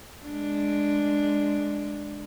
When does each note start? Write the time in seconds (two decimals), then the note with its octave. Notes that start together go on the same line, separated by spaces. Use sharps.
0.24 G#3 D4